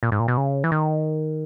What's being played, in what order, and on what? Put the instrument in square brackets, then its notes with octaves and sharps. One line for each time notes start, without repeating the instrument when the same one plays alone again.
[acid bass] A#2
G#2
A#2
B2
C#3
E3
D#3